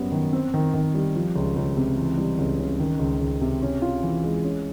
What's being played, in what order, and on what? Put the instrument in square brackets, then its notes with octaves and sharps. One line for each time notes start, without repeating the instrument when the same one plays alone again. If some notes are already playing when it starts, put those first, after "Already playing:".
Already playing: [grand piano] F#2 G3 B3
D#3
C4
D#3
D#3
G3
F3
C#2
C#2
C3
E3
G3
C#2
C#3
D#3
C#2
C#2
C3
C#4
F4
E3
G#3
C#4